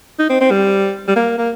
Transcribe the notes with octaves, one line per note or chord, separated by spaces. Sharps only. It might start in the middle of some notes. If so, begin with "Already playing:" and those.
D#4
C4
C4
G3
G3
A#3
A#3